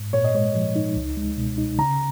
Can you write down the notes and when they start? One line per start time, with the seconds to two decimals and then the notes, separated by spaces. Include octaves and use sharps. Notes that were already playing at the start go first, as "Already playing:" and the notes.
Already playing: G#2
0.13 A#2 C#5
0.24 D#5
0.35 G#3 C#5
0.55 F3
0.76 D#4
0.96 C#2
1.17 G#3
1.37 B2
1.58 D#4
1.79 C#3 A#5